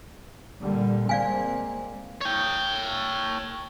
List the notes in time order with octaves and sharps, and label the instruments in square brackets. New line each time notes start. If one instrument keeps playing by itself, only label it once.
[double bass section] A#2 D3 G3
[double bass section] G#3 A#3 C4 [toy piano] D5 F5 G#5
[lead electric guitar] C#5 G5